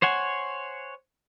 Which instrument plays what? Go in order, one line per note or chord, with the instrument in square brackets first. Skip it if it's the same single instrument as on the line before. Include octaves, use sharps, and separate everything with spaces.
[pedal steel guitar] C5 C#5 F#5 G#5